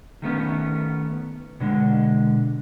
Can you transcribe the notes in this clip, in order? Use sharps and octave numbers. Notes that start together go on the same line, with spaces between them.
D#3 A3 B3 C#4
B2 D3 G#3